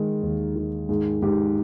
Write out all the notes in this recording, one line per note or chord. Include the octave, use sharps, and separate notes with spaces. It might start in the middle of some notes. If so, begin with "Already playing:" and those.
Already playing: D#3 G#3
D#2
D#3
G#2 G#4
G#2 G4